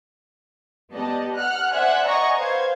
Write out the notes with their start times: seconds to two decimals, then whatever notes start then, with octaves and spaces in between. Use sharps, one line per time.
0.93 B3 G4 D5 D#5 A5
1.36 F#5 F6 F#6
1.71 C5 D5 E5 F#5 G#5 F#6
2.06 D5 D#5 F#5 G#5 A#5 C#6
2.37 B4 C5 F5 G#6